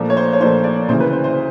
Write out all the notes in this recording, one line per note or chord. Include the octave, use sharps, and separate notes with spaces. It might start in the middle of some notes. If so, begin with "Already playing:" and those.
Already playing: A#2 F3 A3 D4
C#5
C5
C#5
A#2 F3 A3 D4 C5
D5
D2 C#3 E3 C5
B4
C5
C5